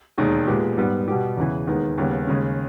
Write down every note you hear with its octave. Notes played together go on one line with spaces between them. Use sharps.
E1 D#2 D#3 G#3
A#2 G#3 B3 G4
G#2 G3 B3
B2 G3 B3 G4
E2 C#3 E3
D#2 D#3 G#3 B3
D#2 C#3 G3 B3
D#2 C#3 G#3 C#4